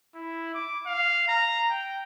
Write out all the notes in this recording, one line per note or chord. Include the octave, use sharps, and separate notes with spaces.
E4
D6
F5
A#5
G5